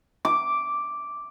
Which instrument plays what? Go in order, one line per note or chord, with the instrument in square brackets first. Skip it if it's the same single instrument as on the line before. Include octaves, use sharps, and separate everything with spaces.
[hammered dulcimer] D6